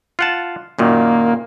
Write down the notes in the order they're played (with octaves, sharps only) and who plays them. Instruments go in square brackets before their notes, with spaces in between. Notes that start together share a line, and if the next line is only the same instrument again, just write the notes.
[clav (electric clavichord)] F4 F#5 A5
[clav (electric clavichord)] F#2 A#2 D#3 [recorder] A#3